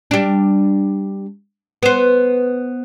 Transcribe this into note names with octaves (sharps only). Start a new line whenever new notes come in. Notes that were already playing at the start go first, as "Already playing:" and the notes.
G3 D4
B3 C5